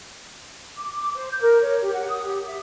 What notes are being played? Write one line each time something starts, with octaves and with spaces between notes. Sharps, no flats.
D6
D6
C5
G6
A#4
C#5
G4
F#5
D#6
G4
E5